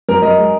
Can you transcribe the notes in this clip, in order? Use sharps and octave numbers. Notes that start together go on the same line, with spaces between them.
F#2 A#4
F#2 A#4 D#5
G#3